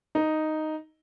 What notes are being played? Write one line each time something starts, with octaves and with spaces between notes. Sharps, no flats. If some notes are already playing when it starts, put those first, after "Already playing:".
D#4